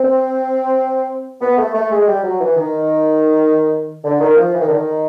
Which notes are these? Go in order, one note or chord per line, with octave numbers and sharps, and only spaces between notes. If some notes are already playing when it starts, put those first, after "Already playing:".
Already playing: C4
B3
A3
A3
G#3
G3
F#3
E3
D#3
D3
D#3
F3
E3
D#3
D3
D#3